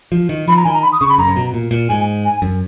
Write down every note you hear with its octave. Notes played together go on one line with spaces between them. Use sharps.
F3
D#3
F3 B5
A#5
D#3 G#5
A#5
B5
D#6
C#3 C#6
B5
F#2 A#5
C#3
B2
A#2
A#2
G#2 G#5
G#5
F#2